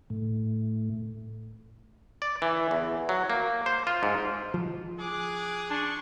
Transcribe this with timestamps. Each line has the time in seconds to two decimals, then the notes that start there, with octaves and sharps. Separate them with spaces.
0.10 A2
2.22 D5
2.42 E3
2.71 E2
3.09 F#3
3.30 A#3
3.66 C5
3.87 F4
4.03 G#2
4.54 F3
4.99 G#4 D6 F#6
5.70 D4 C6 C#6